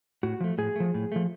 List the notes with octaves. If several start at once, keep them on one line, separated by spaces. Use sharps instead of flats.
A2 F#4
F3 A3
A2 G#4
F3 A3
A2
F3 A3